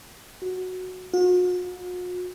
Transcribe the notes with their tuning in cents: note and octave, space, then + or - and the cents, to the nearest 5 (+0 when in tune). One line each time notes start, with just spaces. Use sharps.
F#4 -5
F#4 -45